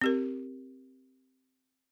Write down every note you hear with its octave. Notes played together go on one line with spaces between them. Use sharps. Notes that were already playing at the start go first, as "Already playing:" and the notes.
C4 G4 A#4